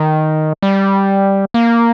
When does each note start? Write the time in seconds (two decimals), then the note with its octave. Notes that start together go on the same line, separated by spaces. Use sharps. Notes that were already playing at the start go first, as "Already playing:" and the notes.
Already playing: D#3
0.63 G3
1.54 A#3